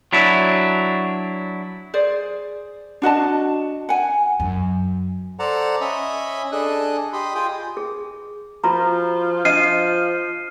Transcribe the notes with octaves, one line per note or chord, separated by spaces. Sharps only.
F#3 D4 E4
G#4 C5 D5
D4 F#4 D#5 A5
F#5 G#5
F#2
A4 C5 D5 F#5 A5 A#5
C#4 D#5 E5 B5
D4 G#4 A4 D#5 F#6
G4 D#5 B5 C6
F4 G#4 G5 D#6
G#4
F3 F4 F#4 A#5
F3 D4 D#5 F6 C7 D#7